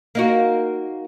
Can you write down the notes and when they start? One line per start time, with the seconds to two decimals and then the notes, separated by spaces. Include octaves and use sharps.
0.15 A#3 D#4 F#4